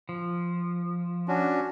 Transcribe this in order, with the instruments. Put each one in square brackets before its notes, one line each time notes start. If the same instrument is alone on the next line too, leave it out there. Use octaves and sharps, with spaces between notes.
[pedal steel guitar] F3
[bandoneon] C#4 D4 F#4